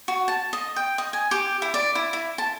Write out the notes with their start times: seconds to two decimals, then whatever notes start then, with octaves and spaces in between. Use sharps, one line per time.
0.08 F#4
0.28 A5
0.53 D#5
0.76 G5
0.98 D#5
1.13 G#5
1.31 G4
1.62 E4
1.74 D5
1.95 E4
2.13 E4
2.38 A5